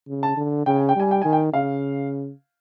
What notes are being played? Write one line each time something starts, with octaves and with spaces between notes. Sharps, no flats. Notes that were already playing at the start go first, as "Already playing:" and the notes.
C#3
A5
D3
C#3 G5
G#5
G5
G3 G#5
G5
D#3 G#5
G5
C#3 F5